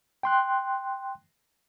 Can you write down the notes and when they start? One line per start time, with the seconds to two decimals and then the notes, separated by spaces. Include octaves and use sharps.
0.23 G5 C6 F#6